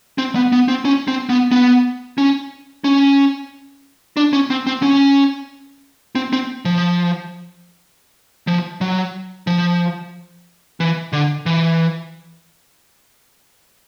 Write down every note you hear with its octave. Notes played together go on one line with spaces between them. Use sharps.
C4
B3
B3
C4
C#4
C4
B3
B3
C#4
C#4
D4
C#4
C4
C4
C#4
C4
C4
F3
F3
F#3
F3
E3
D3
E3